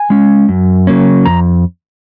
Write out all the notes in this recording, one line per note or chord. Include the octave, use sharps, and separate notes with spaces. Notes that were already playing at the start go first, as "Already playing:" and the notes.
Already playing: G#5
G#3 C#4
F#2
C#3 F#3 A#3 C#4
F2 A#5